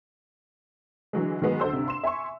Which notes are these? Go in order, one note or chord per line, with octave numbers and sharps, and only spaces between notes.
D3 E3 F#3 G#3
D#3 F#3 G#3 B3
D2 A4 C5 E6
G2 C3
C6 E7
E5 G#5 C6 C#6